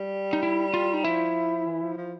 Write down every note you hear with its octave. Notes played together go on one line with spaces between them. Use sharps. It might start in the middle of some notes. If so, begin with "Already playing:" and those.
Already playing: G3
D#4
E4
F4
D#4
F3 E4
E3
F3
F3